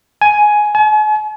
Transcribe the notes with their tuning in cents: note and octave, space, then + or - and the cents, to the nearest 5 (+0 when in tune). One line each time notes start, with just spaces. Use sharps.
G#5 +10
G#5 +45